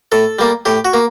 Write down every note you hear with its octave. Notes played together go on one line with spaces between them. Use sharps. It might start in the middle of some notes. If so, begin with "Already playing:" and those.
A2 A4
G3 A#3
A2 G4
F#4
A#3